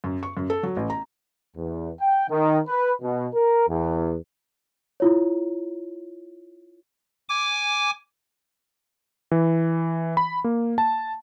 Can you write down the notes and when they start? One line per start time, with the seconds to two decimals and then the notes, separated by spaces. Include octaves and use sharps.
0.04 F#2
0.23 C#6
0.37 F#2
0.50 A4
0.63 F#3
0.77 A1
0.90 A#5
1.56 E2
2.00 G5
2.29 D#3
2.67 B4
3.02 B2
3.34 A#4
3.68 E2
5.00 E4 F4 C#5
7.29 G#5 D6
9.31 E3
10.17 B5
10.44 A#3
10.78 A5